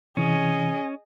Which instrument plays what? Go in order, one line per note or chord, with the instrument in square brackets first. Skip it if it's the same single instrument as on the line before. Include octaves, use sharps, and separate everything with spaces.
[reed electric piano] C3 E3 [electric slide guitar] C#4 [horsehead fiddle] G#4 D#5